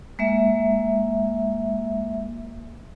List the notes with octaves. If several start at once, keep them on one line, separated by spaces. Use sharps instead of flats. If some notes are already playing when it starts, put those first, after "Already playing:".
G#3 A#3 E5